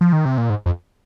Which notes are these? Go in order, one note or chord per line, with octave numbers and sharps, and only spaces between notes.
F3
D#3
C3
A#2
G#2
F2